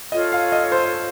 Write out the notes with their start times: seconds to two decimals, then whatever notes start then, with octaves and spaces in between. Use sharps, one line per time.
0.12 F4 A4 C#5 D#5
0.32 F5
0.52 D#5
0.72 C5